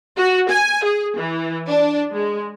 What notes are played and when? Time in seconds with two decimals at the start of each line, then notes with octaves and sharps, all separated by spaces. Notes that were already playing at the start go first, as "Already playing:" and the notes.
0.17 F#4
0.50 G#5
0.84 G#4
1.17 E3
1.68 D4
2.13 G#3